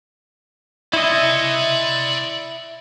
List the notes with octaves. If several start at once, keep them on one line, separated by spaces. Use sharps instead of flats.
E4 D5 D#5 C6